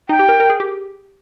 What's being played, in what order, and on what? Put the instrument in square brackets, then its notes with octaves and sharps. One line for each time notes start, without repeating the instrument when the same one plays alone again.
[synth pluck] D#4 [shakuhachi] G5
[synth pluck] G4
A#4
A#4
G#4
G4